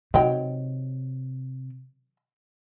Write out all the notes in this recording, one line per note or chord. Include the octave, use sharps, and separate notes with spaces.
C3 D#3 F#3 G5